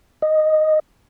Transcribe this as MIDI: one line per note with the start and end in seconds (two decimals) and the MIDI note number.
0.22 0.79 75